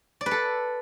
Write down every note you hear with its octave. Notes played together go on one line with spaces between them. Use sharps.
D5
B4
A4